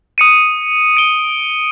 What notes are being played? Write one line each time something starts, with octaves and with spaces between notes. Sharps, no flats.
D#6 C#7 D#7
D7 G7